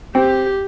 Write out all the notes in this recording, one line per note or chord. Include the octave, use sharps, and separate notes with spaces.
C4 G4